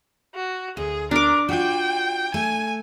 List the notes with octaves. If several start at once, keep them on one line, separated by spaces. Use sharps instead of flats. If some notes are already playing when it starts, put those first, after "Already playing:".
F#4
D2 G#4
D4 A#4 D6
F4 F#4 G5
A3 G#5